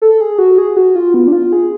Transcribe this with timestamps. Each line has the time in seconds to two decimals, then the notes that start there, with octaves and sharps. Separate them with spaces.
0.02 A4
0.21 G#4
0.38 F#4
0.58 G#4
0.77 F#4
0.96 F4
1.14 B3
1.28 D4
1.32 F4
1.52 G#4